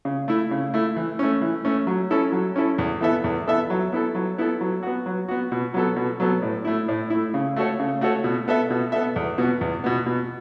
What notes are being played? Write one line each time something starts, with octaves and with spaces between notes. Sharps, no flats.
C#3
A3 E4
C#3
A3 E4
E3
A3 C#4
E3
A3 C#4
F#3
C#4 E4 A4
F#3
C#4 E4 A4
E2
E3 B3 A4 E5
E2
E3 B3 A4 E5
F#3
B3 E4 A4
F#3
B3 E4 A4
F#3
B3 F#4
F#3
B3 F#4
B2
F#3 B3 A4
B2
F#3 B3 A4
A2
A3 E4
A2
A3 E4
C#3
A3 F#4 A4 C#5
C#3
A3 F#4 A4 C#5
B2
B3 A4 E5
B2
B3 A4 E5
E2
B2 B3
E2
B2 B3
B2